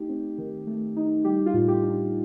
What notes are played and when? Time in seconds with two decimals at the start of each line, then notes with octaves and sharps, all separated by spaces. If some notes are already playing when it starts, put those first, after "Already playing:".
Already playing: A3 D#4 G4
0.09 C4
0.38 D#3
0.67 A3
0.96 D#4
1.25 G3 G4
1.46 F4
1.54 A2
1.68 G4
1.83 D4